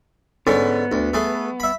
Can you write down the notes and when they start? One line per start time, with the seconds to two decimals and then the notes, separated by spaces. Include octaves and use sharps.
0.47 G#2 D3 B3 C#4
0.92 D2
1.14 A3 G#4 B4
1.60 E5 B5